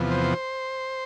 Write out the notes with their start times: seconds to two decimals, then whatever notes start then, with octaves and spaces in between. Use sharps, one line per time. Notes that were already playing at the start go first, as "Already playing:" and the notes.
Already playing: E2 C3 F3 B3
0.11 C5